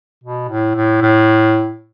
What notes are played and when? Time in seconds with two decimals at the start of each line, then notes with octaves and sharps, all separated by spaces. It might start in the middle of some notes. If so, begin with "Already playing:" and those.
0.24 B2
0.49 A2
0.76 A2
1.02 A2